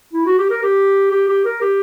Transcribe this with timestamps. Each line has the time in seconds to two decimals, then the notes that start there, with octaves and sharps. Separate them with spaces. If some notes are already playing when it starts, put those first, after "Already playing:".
0.13 E4
0.26 F#4
0.38 G4
0.50 A#4
0.63 G4
1.11 G4
1.28 G4
1.45 A#4
1.61 G4